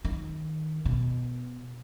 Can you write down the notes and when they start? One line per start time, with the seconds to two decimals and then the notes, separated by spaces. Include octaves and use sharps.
0.05 D#3
0.85 B2